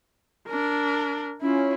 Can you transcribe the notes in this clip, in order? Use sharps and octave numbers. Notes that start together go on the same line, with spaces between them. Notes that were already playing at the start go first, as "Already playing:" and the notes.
D4 A#4
C#4 E4 F4